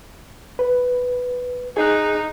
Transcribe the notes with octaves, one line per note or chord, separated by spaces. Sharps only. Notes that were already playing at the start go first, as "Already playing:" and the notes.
B4
D#4 G#4 F#6